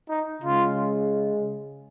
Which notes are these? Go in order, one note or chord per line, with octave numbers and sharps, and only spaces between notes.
D#4
C#3 G#3 F4